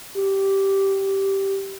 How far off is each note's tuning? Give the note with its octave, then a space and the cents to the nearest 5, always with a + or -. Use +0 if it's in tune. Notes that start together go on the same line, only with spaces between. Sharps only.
G4 -10